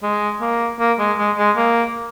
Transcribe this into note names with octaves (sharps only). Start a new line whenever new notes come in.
G#3
A#3
A#3
G#3
G#3
G#3
A#3